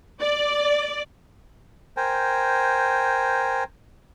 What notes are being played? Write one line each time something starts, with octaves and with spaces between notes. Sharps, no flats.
D5
A#4 C5 G5 G#5